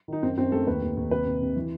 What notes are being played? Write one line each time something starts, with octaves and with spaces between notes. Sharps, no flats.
D#3 D#4
F#2 C4
F#2 C4
A3 A4
D#2 B4
D#2
D#2
C3 B4
C3
C3
E3